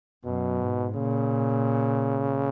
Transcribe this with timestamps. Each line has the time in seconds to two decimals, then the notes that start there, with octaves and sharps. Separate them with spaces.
0.25 F#2 B2
0.60 G#2
0.95 A#2 C#3